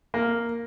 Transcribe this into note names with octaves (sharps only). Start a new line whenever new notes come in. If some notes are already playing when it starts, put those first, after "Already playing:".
A#3